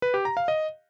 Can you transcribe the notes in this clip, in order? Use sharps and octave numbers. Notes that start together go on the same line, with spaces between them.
B4
G4
A#5
F5
D#5